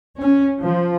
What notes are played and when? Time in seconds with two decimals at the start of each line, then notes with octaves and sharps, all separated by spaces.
0.20 C#4
0.60 F3